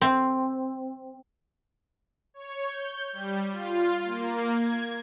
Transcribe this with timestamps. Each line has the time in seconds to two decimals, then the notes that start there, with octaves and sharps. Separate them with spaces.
0.01 C4
2.34 C#5
2.66 G6
3.13 G3
3.52 F4
4.04 A#3
4.53 G#6